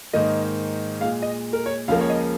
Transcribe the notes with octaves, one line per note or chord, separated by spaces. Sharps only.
G#2 D#3 A#3 D#5
A#2 G#3 F5
D#5
A#4
C#5
C#2 C#3 F3 A#3 F5
C#5
D#5